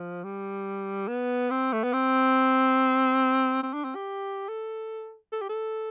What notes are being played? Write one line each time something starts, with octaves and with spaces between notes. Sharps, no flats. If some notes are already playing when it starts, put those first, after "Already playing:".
Already playing: F3
G3
B3
C4
A3
B3
C4
C4
D4
C4
G4
A4
A4
G4
A4